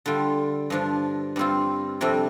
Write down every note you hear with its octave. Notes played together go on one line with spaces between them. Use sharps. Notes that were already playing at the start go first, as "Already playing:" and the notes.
D3 G3 F4
G2 F3 D4
G2 G3 C4 F4
F2 C3 G3 D4